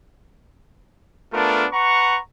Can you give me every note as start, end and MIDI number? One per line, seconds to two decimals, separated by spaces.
1.32 1.65 57
1.32 1.65 59
1.32 1.65 62
1.32 1.65 65
1.32 1.65 70
1.72 2.19 71
1.72 2.19 78
1.72 2.19 82
1.72 2.19 85